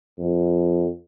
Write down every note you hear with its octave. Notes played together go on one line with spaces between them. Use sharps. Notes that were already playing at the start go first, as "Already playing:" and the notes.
F2